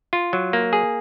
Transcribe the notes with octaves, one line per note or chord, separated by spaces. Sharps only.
F4
F#3
A#3
G#4